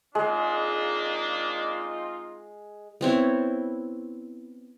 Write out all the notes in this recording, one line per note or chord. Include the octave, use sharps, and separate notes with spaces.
G#3 A#3 C4 D4 D#4 F4
B3 C4 E4 C#5